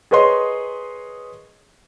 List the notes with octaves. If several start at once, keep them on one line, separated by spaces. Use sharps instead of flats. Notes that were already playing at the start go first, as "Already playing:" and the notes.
G#4 A#4 B4 C#5 D#5 C6